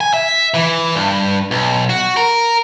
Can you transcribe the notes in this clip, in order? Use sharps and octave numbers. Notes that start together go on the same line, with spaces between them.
G#5
E5
E3
G2
B1
F#4
A#4